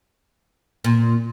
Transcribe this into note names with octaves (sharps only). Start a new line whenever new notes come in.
A#2